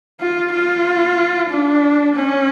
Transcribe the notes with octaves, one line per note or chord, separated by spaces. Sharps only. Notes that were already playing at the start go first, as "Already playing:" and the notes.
F4
F4
D4
C#4